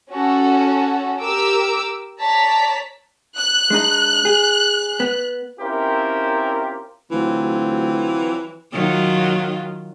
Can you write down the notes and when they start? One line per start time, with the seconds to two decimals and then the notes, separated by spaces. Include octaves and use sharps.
0.11 C#4 F#4 A4
1.21 G4 A#4 D6 E6
2.19 C#5 D5 A5 A#5 B6
3.36 F#6
3.70 G#3 D4 D#4
4.25 G#4
5.00 B3
5.60 C4 C#4 E4 F4 G4 A#4
7.11 D2 E3 F#3 C4 F4
8.73 D#3 F#3 F4